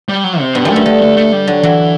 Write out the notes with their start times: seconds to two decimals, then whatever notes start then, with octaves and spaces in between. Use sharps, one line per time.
0.09 G3
0.24 F#3
0.40 C3
0.55 G2 B2
0.65 F#2 A3
0.76 G2
0.86 D3 A3
1.01 A3
1.17 A3
1.32 G3
1.48 D3 F#3
1.63 E3 F#3